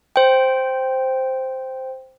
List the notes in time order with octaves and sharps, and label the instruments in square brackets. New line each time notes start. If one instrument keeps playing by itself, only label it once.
[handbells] C5 G5